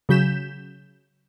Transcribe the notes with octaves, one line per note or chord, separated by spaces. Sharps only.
C#3 F#3 G6 B6 E7